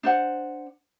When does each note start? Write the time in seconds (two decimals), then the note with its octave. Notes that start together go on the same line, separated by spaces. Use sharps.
0.03 D4 C5 F#5